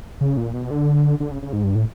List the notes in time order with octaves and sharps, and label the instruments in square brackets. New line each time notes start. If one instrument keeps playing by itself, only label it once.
[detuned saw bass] C#3
A#2
B2
D3
D3
C#3
C#3
G#2
G2
A2